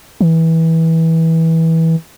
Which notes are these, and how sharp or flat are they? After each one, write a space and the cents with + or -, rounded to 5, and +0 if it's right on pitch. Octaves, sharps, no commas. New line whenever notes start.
E3 -20